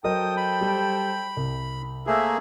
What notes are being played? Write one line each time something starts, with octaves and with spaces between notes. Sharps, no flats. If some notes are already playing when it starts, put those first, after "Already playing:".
F#3 A4 A#4 C5 D#5 G5 D#6
B5
G3
C2
A3 A#3 G#4 A#4 C5 E5